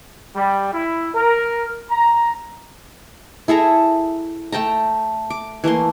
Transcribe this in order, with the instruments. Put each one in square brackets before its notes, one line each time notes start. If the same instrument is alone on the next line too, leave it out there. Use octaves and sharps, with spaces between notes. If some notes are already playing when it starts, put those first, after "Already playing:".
[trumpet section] G3
E4
A#4
A#5
[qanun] E4 G#4 A4 A#5
A3 G5 A5 A#5
D6
E3 A3 A#3 C6